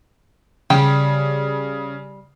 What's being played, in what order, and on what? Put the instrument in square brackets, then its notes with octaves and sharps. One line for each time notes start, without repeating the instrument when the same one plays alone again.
[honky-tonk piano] C#3 [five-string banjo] G3 G4